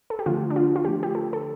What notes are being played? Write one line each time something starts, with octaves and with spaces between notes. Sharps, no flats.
A4
G4
D3 F3 A3 F4
D4
F4
F4
D3 F3 A3 G4
G4
A4
A4